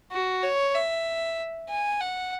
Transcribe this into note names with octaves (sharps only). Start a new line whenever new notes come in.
F#4
C#5
E5
G#5
F#5